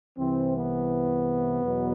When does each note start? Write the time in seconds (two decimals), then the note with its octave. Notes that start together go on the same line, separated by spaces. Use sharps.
0.18 C2 C3 E3 C4
0.55 B3
1.63 E2 B2 F#3